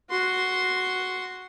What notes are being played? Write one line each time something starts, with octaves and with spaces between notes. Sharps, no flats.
F#4 C6